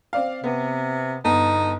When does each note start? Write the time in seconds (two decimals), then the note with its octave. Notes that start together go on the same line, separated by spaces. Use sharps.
0.13 C4 D5 F5
0.44 C3 B3
1.25 G1 B3 D#4 A5